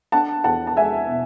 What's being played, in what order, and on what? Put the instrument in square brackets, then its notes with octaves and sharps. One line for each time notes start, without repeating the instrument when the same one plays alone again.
[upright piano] D4 F#5 A5
E2 F#5 A5
A5
G#3 E5 G#5
B2